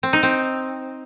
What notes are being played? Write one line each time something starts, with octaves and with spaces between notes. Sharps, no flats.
C4
D#4
C4